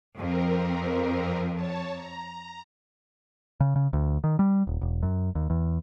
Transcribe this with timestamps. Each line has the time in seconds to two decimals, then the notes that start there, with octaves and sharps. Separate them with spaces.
0.18 F2 C4 A#4
1.55 C#5 A5
1.93 A#5
3.60 C#3
3.76 C#3
3.93 D2
4.24 D#3
4.39 G3
4.67 D#1
4.81 E1
5.03 F#2
5.35 D#2
5.50 E2